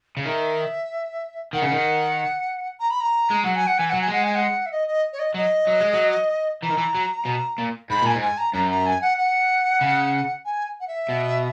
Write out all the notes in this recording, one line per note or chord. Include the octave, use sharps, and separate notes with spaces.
C#3
D#3 E5
D#3 F#5
C#3
D#3
A#5
B5
A#5
G#3
F#3 F#5
G#5
F#5
E3 G#5
F#3 F#5
G#5
G#3 F#5
G#5
F#5
E5
D#5
D#5
C#5
D#5
F#3 D#5
F#3
G#3
F#3
E3 A#5
D#3
E3
F#3
B2
A#2
G#2 B5
A#2 G#5
G#2
G#5
A#5
F#2 A#5
A#5
G#5
F#5
F#5
C#3
G#5
F#5
E5
B2